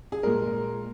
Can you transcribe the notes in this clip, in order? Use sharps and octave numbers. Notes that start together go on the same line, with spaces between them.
G#4
A#2 G#3 A#4